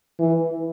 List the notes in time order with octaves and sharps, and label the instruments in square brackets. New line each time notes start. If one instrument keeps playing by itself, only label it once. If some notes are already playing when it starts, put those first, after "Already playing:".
[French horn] E3